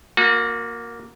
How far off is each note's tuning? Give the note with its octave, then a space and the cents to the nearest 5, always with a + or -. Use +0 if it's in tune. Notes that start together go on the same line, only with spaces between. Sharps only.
A#3 +0 F#4 -35